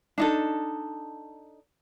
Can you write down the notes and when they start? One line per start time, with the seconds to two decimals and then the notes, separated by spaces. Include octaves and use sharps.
0.18 D4 D#4 A4